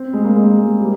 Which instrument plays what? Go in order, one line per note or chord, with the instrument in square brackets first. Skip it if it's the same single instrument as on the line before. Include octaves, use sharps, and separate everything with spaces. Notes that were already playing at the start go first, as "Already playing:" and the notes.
Already playing: [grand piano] C4
G#3
A#3
G#3
G#3
G3